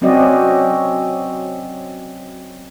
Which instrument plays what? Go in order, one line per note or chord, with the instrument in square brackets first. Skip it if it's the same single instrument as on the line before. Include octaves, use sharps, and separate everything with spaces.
[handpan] F#3 C4 C#4 F#4 D5 D#5